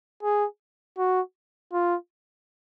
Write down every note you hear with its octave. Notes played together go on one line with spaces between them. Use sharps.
G#4
F#4
F4